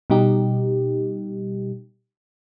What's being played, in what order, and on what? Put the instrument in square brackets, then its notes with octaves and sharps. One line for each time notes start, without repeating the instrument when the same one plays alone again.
[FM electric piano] B2 G3 D#4 G4